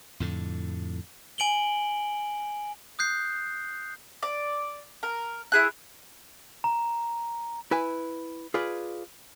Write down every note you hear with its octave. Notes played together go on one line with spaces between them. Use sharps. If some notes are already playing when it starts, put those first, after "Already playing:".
F2 A2 D3
G#5 D7 F#7 G7
D#6 F#6 G6 C7
D5
A#4
E4 G#4 F#6
A#5
E4 B4 G#5
F4 G#4 B4 D5